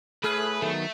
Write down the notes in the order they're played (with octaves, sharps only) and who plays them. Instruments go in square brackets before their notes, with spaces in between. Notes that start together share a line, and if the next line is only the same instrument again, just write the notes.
[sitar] A2 G#4 [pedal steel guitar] A3 A4 F6 [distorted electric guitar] B4
[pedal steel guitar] D#3 F#3 B3 [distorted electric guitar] A3